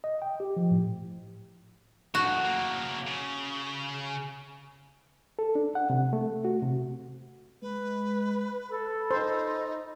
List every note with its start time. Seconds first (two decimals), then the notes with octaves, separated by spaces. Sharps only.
0.04 D#5
0.22 G5
0.40 G4
0.57 F3
0.71 A2
2.15 F#2 A2 F#4
2.43 C#3 A#3
3.07 C#3
5.39 A4
5.55 D4
5.75 F#5
5.90 C3
6.13 A3
6.45 F#4
6.62 C3
7.62 G#3 B4
8.70 A4 B5
9.11 D#4 C5